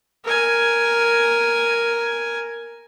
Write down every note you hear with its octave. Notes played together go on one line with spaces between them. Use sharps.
A#4 G#5